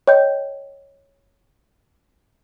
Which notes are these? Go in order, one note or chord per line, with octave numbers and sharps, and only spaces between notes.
C#5 D#5 G5 G6